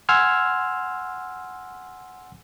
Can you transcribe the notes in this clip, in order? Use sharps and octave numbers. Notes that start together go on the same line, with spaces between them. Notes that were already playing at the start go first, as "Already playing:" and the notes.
F#5 G#5 C6 E6 F6 G#6